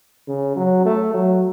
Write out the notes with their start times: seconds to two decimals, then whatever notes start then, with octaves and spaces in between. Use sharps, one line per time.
0.28 C#3
0.56 F#3
0.85 A3
1.14 F#3